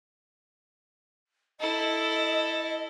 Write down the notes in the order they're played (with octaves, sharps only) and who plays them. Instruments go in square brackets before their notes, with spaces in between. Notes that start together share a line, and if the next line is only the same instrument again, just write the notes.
[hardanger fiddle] E4 A4 [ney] D#5